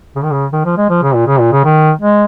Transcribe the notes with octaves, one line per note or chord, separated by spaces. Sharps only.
C#3
D#3
C#3
D#3
F3
G#3
F3
C#3
A#2
C#3
A#2
C#3
D#3
G#3